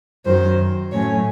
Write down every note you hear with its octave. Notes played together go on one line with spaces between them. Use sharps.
F#2 D#3 F#3 C5
A2 F#3 A3 C#4 C#5